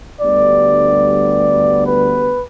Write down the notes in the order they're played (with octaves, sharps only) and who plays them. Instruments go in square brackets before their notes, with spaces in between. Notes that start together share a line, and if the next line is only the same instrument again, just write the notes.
[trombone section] D2 D3 G3 B3 [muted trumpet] D5
[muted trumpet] B4